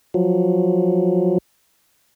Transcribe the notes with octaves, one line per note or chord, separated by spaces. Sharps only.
F3 F#3